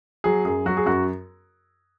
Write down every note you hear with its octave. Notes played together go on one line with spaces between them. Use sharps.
F#3 G#4
F#2 G#4
F#3 F#4
G#4
F#2 F#4